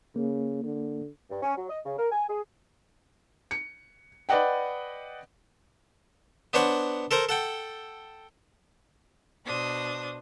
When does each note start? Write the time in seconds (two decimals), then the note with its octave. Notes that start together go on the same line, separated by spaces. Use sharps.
0.16 C#3 A#3
0.64 D3
1.30 G2
1.42 C#4
1.56 F#3
1.70 D#5
1.85 C#3
1.97 A#4
2.11 G#5
2.28 G#4
3.51 C#7
4.29 B4 D5 D#5 F#5 G5
6.53 B3 D4 C5 C#5 F#5
7.11 A4 A#4 C5 A#5
7.29 A4 F#5 G5
9.45 B2 D4 C5 D#6